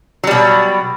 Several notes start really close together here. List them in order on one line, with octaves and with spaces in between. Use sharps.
F#3 G3 B2